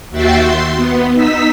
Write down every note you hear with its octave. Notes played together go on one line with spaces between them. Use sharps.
D#2 F#4 E5 G5 A6 C7
C6
B3
D#4 E6 B6